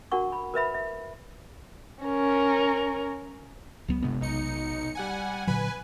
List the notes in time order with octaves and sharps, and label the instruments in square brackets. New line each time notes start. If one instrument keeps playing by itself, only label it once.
[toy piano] D4 F#4 A#4 F#5 C#6
B5
A#4 B4 E5 B5
E5
[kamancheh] C#4 A#4
[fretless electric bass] C#2 F#3 B3
[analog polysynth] G1 [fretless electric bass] C3 G#3 B3
[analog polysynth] B1 D#4 C#7
G3 F#5 G#5
[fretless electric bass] A#2 D3 F#3 [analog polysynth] B4 G#5